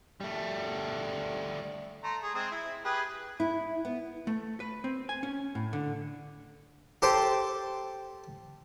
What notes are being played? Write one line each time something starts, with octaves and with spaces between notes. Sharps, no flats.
G3 A3
A3 A#5 C6
G#4
G#3 C4 G#4
E4
G4 G#4 B4
E4
B3
A3
B4
C4
G#5
C#4
A2
D3
G4 A4 C5 G5